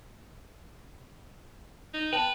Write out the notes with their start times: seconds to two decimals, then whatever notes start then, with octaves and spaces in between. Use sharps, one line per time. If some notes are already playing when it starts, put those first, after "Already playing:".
1.93 D#4
2.12 B4 G5 A5